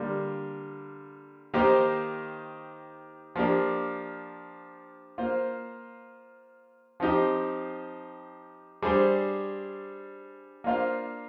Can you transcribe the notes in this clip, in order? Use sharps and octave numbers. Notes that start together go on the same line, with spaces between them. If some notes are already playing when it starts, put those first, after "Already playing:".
Already playing: D3 G3 A#3 F4
D#3 A#3 D#4 G4 C5
F3 A#3 D4 G4
A#3 F4 C5
F3 C4 D#4 G4
G3 D4 G#4 C5
A#3 D4 F4 C5 F5